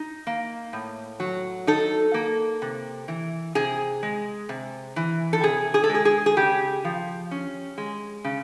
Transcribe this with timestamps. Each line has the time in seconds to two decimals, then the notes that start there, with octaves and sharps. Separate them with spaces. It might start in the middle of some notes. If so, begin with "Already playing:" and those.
Already playing: D#4
0.27 A#3
0.73 A2
1.20 F#3
1.67 D#4 A4
2.14 A#3
2.62 C3
3.08 E3
3.55 C3 G#4
4.03 G#3
4.49 C3
4.96 E3
5.33 A4
5.43 C3 G#4
5.74 G#4
5.84 A4
5.89 G#3 G#4
6.05 G#4
6.26 G#4
6.37 C#3 G4
6.85 F3
7.31 C#4
7.78 G#3
8.24 C#3